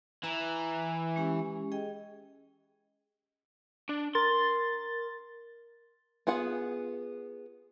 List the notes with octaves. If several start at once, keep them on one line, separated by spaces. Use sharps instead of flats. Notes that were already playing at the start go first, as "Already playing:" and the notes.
E3 A#5
G#3 C#4 G4
G#4 D#5 G5
D4
A#4 C6 A6
B3 F4 G#4 F#5